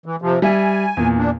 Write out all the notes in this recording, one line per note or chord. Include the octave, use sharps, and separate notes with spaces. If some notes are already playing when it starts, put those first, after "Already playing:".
E3
C3 F3
G3 E5 G#5
E2 A#2
D4